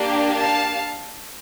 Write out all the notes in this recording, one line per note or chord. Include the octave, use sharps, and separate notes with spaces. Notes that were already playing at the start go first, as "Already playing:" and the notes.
Already playing: A#3 D4 G4
F5 A5